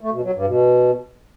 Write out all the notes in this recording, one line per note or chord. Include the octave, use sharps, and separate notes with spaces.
A3
B2
F#3
G2
B2